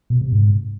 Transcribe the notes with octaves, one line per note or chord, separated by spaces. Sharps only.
B2
C3
G#2